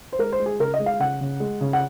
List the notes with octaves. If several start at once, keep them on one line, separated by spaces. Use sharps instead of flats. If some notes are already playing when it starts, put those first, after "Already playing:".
C5
G#3 A#4
C5
G#3
G#4
C#3 A#4
D#5
G#3
F5
C#3 F#5
C#3
G#3
C#3
F#5